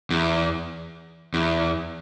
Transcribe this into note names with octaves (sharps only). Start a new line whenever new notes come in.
E2
E2